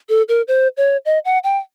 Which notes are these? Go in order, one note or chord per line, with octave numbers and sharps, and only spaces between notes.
A4
A#4
C5
C#5
D#5
F#5
G5